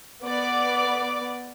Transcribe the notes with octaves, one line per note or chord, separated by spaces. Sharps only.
B3 D5 D6